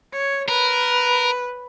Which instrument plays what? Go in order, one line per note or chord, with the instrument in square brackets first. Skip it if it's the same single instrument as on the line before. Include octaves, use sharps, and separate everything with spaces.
[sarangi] C#5
[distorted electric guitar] A#4 [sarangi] B4